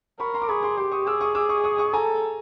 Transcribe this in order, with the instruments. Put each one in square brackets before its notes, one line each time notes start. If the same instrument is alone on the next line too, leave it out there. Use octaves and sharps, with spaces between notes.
[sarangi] A#4 [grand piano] B5 C#6
[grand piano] A#5 C6
D6
[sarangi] G#4 [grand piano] B5 C#6
[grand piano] C6 D6
[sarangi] G4 [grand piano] C6 D6
[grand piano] C#6 D#6
[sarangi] G#4 [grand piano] D6 E6
[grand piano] C#6 D#6
D6 E6
C#6 D#6
C#6 D#6
C#6 D#6
[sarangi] A4 [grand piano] G#5 A#5